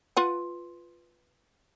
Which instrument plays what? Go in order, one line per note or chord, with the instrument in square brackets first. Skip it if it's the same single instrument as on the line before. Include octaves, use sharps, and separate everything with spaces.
[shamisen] F4 B4 F#5